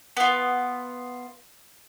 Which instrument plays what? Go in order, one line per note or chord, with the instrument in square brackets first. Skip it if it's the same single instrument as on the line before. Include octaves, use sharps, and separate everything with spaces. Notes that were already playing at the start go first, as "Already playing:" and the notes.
[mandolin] B3 F4